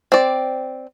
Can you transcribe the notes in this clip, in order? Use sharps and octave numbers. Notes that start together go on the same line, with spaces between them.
C4 D5